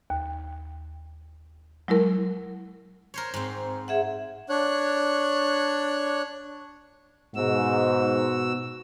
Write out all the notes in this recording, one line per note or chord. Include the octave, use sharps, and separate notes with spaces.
D#2
F#3 G#3 E4 A#4
A#4 C5 C#5
G#2 C4
G#4 E5 F#5
D4 C#5 F#6
G#2 B2 F#4 E6